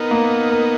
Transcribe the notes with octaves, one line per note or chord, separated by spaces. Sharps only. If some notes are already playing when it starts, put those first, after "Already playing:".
Already playing: B3 D#4 A#4
A#3
A#4